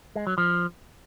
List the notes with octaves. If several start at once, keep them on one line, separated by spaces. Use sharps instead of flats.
G#3
F#3
F3